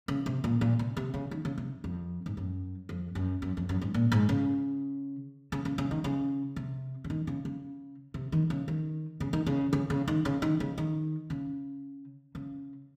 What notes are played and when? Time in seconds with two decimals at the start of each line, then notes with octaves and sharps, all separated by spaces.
0.08 C#3
0.26 C3
0.44 A#2
0.61 A#2
0.79 C3
0.97 C3
1.14 C#3
1.31 D#3
1.45 C#3
1.58 C3
1.84 F2
2.26 G#2
2.37 F#2
2.89 F2
3.15 F#2
3.42 F#2
3.57 F2
3.69 F#2
3.81 G#2
3.94 A#2
4.12 G#2
4.29 C#3
5.52 C#3
5.65 C#3
5.78 C#3
5.91 D#3
6.04 C#3
6.56 C3
7.04 C#3
7.10 D#3
7.27 C#3
7.45 C#3
8.14 C3
8.32 D#3
8.50 C#3
8.68 D#3
9.20 C#3
9.33 D#3
9.46 C#3
9.73 C#3
9.90 C#3
10.08 D#3
10.25 C#3
10.42 D#3
10.60 C#3
10.78 D#3
11.30 C#3
12.35 C#3